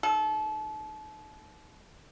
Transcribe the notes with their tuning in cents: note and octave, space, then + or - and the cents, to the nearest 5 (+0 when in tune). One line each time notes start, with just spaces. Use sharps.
D#3 +0 A4 -35